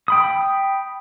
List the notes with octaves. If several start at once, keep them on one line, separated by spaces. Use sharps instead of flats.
G5 B5 D#6